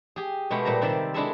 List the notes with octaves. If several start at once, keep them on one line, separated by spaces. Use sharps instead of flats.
G4 G#4
B2 G#3 A3 B3 G4
A#2 G3 C5 A#5
C3 D#3 C5 D5 E5
G#3 D4 E4 G#4 A4 E5